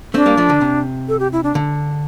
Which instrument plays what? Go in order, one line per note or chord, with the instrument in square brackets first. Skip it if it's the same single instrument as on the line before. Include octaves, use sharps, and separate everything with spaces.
[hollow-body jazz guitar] A3 C4 [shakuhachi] D4
[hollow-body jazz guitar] G3 A#3
F3 A3
D3
C3
[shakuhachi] A4
G4
E4
D4
[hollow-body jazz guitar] D3